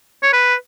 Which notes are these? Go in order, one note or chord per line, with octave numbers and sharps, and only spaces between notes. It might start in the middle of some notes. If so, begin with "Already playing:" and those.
C#5
B4